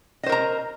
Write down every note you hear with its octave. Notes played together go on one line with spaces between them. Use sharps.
A#4 C5 D#5 A#5